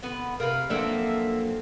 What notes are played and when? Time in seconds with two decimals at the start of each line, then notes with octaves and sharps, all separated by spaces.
0.03 D3 B3 B4
0.40 C3 A#4 B4 F5
0.70 F3 F#3 A#3 C4 D4 A4 E5